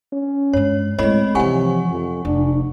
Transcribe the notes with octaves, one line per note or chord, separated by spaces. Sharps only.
C#4
G2 G#3 C#5
A2 G#3 C4 C#5 D#5 B5
C3 E3 F3 F#5 G#5 C#6
F2
F1 D4